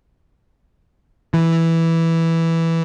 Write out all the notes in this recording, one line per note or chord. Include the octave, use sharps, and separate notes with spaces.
E3